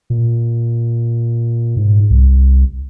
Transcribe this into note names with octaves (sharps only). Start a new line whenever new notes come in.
A#2
G#2
C2